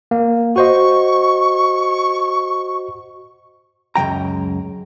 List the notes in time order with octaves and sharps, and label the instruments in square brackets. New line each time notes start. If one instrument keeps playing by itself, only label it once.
[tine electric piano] A#3
[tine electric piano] F#4 C5 D#5 [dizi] C#6
[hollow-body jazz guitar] C#2 F#2 F3 G5 A#5